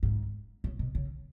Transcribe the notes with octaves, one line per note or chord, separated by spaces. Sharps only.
G#2
A2
B2
C#3